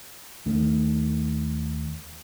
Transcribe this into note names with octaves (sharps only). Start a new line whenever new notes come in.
D#2 D#3 A3